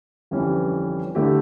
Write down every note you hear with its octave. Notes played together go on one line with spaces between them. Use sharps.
G1 F2 E3 G3 C#4
D3 A3 E4 G4